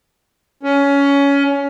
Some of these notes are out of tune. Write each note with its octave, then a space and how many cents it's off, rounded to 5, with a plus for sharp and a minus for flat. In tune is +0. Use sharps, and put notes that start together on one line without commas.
C#4 +20